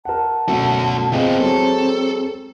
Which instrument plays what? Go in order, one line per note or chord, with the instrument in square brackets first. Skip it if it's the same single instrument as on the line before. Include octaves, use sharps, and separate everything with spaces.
[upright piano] A#4 F#5 [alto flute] A5
[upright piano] F#2 B2 [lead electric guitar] A3 F#4
[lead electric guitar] B3 F4 [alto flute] C4 [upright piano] G#4 D#5 G5
[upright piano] F#3 G#3 [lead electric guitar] A4